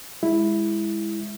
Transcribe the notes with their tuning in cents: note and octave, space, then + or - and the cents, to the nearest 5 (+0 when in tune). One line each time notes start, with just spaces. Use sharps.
G#3 -15 E4 +0